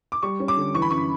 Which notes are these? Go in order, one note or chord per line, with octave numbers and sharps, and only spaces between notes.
D6
G3 C#6
C#4
D6
D3
E3 C#6
B5
F#2 C#6